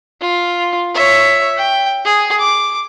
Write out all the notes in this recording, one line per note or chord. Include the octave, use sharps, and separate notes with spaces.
F4
C#5 E5
G5
G#4
D6